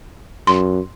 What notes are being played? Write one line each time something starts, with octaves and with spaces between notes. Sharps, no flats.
F#2 C6